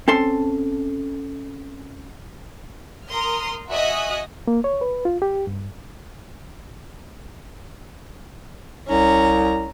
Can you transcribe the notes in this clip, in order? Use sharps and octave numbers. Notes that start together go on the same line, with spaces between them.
C4 C#4 A4 A5 C6
A#4 A#5 C6 D#6 F6
F#4 D#5 E5 G#5 D#6 F#6
A#3
C#5
B4
F4
G4
G2
C2 C#4 A#5